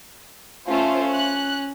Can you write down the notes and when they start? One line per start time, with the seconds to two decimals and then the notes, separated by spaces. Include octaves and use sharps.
0.68 A3 C#4 F4 C5
1.13 F#6